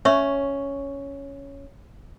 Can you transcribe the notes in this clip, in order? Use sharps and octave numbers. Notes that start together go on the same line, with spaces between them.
C#4 C#5 E5 C#6